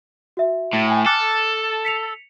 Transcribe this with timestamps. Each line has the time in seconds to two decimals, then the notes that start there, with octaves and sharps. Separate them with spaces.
0.37 F#4 E5
0.74 A2
0.87 G5 G#5
1.06 A4 D6 F6 F#6
1.85 B6 C#7 F7